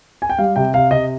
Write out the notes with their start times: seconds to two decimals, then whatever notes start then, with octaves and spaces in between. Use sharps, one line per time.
0.22 G#5
0.30 G5
0.38 G3 F5
0.56 C3 G5
0.74 C3 F5
0.91 C3 D#5